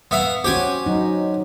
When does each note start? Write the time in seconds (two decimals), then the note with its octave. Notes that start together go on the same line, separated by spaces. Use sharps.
0.11 B3 E5 F5
0.44 C#4 F#4 G4 C5 G5 G#5
0.86 F#3 D#4